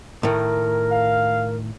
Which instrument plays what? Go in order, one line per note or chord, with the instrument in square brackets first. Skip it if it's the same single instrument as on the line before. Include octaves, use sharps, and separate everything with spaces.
[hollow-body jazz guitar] A2 D#3 [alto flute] A#4
[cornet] F5